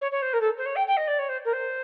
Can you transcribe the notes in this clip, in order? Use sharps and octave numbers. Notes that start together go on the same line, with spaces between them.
C#5
C#5
C5
A#4
A4
C5
C#5
G5
G5
D#5
D5
C#5
C5
A#4
C5